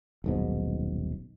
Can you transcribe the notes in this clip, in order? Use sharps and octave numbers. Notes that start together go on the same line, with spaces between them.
D#1 B1 G#2